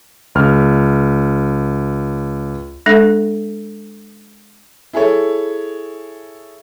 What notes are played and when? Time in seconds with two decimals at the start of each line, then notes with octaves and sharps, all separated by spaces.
0.35 C#2 F6
2.86 G#3 D4 A4 E5
4.93 E4 G#4 A4 C#5